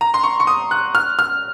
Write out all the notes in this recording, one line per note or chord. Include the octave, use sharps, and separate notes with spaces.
A#5
C6
C#6
C#6
D#6
F#6
F6
F6